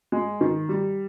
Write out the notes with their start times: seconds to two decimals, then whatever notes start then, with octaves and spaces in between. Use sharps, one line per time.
0.12 G#3
0.41 D#3
0.69 G3